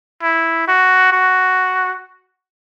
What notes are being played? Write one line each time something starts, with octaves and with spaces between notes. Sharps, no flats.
E4
F#4
F#4